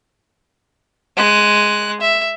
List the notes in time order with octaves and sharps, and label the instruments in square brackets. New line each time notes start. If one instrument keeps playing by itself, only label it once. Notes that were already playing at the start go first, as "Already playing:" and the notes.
[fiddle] G#3 F#6
E5